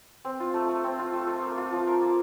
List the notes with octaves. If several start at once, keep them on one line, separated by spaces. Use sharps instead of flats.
C4
F4
A3
A3
C4
F4
A3
A3
A#3
F4
F3
A#4
A#3